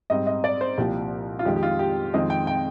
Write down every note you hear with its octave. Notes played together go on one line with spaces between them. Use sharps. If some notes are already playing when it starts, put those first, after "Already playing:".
G#2 G3 C4 D#5
D#5
D5
C5
C2 A#2 F3 G4
F4
F2 D#3 G#3 G4
G4
F4
G4
F2 D#3 G#3 C4 D#5
G5
G5